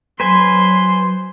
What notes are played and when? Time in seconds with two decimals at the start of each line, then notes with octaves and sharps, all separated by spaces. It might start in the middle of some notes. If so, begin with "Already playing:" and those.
0.20 F#3 B4 C5 G#5 C6